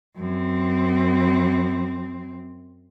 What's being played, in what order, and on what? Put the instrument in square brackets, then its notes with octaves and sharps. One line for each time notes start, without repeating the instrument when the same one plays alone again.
[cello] F#2 C4